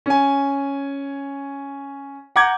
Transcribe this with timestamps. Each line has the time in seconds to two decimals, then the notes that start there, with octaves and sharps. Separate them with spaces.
0.06 C#4 G#5
2.36 F#5 A#5 D6 G6 G#6